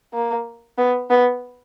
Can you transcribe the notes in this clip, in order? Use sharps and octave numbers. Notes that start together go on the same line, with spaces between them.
A#3
B3
B3